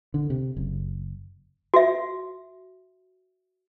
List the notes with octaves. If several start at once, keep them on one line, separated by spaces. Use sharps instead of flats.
D3
C3
F#1
F#4 E5